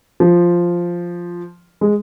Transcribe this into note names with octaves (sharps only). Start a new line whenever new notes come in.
F3
G#3